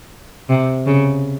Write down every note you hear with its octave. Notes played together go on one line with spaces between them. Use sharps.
C3
C#3